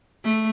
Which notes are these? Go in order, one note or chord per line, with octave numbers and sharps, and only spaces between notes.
A3